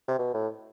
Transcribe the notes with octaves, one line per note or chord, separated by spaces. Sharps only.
C3
B2
A2